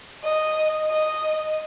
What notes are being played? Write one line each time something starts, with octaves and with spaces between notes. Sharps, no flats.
D#5
D#5